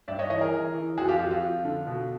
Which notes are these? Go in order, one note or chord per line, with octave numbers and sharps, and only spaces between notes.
G2 D5 E5
C#5 D#5
E3 C#5 D#5
G#4 A#4
E3
E3
F2 F#4 G#4
F4 G4
F2 F#4
F4
F3
D3
B2